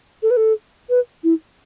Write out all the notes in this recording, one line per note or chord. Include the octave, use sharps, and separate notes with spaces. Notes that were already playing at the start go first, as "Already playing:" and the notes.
A4
B4
A4
B4
E4